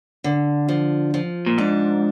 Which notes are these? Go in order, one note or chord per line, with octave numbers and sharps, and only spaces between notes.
D3
F3
F3
A#2
G#2 D4